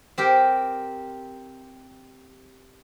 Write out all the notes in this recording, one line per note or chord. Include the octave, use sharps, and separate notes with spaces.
C4 G4 A#4